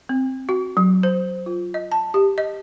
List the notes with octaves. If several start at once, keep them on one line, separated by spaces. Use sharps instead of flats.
C4
F#4
F#3
C5
F4
D#5
A5
G4
D#5